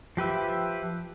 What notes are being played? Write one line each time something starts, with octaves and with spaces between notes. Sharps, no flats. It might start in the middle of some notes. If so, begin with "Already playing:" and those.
F3 G4 B4 E5